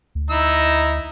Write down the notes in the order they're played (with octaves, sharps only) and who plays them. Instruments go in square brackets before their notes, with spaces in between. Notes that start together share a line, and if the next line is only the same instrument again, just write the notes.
[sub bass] D2
[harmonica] D#4 E4 E6